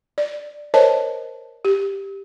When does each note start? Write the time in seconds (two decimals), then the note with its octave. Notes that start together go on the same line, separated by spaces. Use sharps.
0.18 D5
0.74 A#4 C5 C#5 D#5 A5
1.65 G4